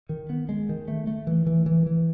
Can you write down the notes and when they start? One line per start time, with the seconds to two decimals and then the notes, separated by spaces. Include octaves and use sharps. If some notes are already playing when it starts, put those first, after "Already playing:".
0.09 D#3
0.30 B3
0.49 G#3
0.69 D#3
0.88 A3
1.07 A3
1.27 E3
1.47 E3
1.66 E3
1.86 E3